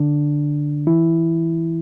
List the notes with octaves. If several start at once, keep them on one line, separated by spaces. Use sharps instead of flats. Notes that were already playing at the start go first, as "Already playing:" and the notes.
Already playing: D3 D4
E3 E4